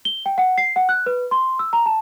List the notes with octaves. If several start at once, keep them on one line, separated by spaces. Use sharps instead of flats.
G7
G5
F#5
C7
F#5
F#6
B4
C6
E6
A#5
A5